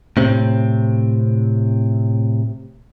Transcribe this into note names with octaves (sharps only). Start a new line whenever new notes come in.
A2 C3 C4